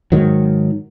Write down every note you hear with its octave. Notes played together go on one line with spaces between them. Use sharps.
G#2 D#3 F#3